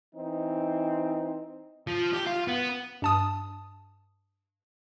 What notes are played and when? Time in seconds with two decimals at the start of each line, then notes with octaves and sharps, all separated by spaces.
0.15 E3 C4 D#4
1.87 F3
2.13 G4
2.26 F4
2.48 B3
3.02 G2 A5 D#6